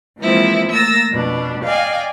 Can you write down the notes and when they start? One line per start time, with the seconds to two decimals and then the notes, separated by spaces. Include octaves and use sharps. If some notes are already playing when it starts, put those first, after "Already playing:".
0.19 E3 F3 G#3 A#3 C4 E4
0.68 A3 A#3 E6 A6 A#6
1.11 F2 B2 B3 D4
1.64 D5 D#5 F5 G5 G#5